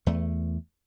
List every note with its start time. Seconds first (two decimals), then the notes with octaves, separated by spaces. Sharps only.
0.07 E2 A3